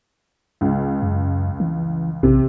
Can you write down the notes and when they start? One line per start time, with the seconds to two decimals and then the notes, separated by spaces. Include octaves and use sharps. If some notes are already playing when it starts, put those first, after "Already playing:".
0.61 C#2
1.02 F#2
1.60 E3
2.23 A#1 C3